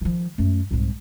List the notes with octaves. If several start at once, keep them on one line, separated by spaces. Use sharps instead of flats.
D#3 F3
F#2 A3
C2 G#2